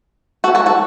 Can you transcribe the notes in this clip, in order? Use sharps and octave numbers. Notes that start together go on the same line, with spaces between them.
F#4 A4
F#4 A4
F#4 A4